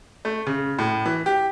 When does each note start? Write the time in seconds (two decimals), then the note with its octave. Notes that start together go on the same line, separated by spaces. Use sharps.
0.25 A3
0.47 C#3
0.79 A2
1.06 E3
1.26 G4